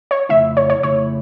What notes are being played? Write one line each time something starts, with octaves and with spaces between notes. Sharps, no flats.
C#5
F2 C#3 A3 E4 E5
C#5
C#5
F2 C#3 A3 E4 C#5